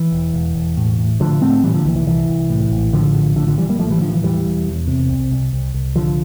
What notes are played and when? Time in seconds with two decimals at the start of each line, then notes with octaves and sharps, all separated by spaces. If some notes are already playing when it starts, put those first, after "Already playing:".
Already playing: E3
0.12 E1
0.34 E1
0.55 E1
0.77 A2
0.99 A2
1.20 A2 D3 F3
1.42 A2 A3 C4
1.63 A#2 E3 G3
1.74 D3 F3
1.85 C2 E3
1.96 E3
2.06 C2 E3
2.29 C2
2.50 A2
2.72 A#1
2.93 A2 D3 F3
3.15 A#1
3.36 A2 D3 F3
3.47 D3 F3
3.58 A1 E3 G3
3.69 G3 A#3
3.79 A1 F3 A3
3.90 E3 G3
4.01 A2 D3 F3
4.12 E3
4.22 E1 E3 G3
4.45 E1
4.66 E2
4.88 C3
5.09 C2
5.31 C2
5.53 C2
5.74 C2
5.96 A1 D3 F3